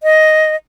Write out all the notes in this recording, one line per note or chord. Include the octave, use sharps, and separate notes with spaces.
D#5